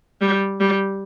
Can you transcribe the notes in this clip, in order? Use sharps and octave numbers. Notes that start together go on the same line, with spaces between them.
G3
G3